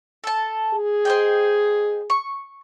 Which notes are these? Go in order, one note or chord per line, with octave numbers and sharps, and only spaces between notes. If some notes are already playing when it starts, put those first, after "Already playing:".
A4 A5
G#4
C5 D#5 G5
C#6